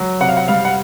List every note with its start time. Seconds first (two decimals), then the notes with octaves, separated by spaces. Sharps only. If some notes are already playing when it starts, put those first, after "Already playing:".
Already playing: F#3
0.20 C3 F#5
0.29 F5
0.37 F#5
0.48 G3 F5
0.65 F#5